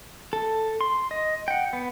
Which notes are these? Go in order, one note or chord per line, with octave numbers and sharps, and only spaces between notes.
A4
C6
D#5
F#5 G5
B3